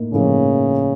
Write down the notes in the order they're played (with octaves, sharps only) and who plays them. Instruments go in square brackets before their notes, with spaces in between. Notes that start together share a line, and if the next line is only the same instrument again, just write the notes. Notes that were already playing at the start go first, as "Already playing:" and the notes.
Already playing: [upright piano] A2 A#3 D#4
[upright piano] A2 F3 A#3 D#4 [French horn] C#3